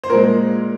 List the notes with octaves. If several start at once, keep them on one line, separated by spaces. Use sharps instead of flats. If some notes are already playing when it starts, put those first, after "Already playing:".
C5
A#2 G#3 A#4